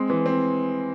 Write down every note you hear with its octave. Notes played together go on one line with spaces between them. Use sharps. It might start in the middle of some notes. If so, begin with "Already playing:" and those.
Already playing: G#3 C4
E3
C4